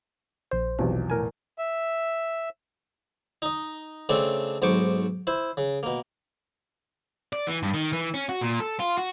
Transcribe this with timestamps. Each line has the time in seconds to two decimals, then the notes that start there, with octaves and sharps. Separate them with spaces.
0.51 A#1 C5
0.79 B1 E2 C3 F3
1.10 A2 A#4 G#5
1.58 E5
3.42 D#4 D#5
4.09 C#3 A3 C4 D4
4.62 B1 G#2 C5 C#6 D6
5.27 E4 C5
5.57 C#3
5.83 B2 A#3
7.33 D5
7.47 E3
7.63 G2
7.74 D#3
7.93 E3
8.14 C#4
8.29 F#4
8.41 A#2
8.60 A4
8.80 F4
8.98 F#4